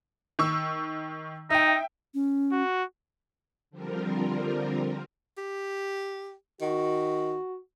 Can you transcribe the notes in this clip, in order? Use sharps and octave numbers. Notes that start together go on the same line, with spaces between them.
D#3 C#6 E6
D#4 E5 G5
C#4
F#4
D3 F3 G3 C4 F4 A#4
G4
D#3 F#4